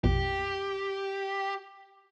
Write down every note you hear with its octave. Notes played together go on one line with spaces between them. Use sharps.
A#1 F2 B2 G4